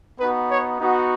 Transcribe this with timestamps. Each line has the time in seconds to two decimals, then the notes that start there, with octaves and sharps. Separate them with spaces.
0.20 B3 D#4 F#4 B4
0.50 C#5
0.79 B3 D#4 F#4